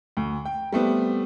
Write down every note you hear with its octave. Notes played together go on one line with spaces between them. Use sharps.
D2
G5
G3 A3 B3 C4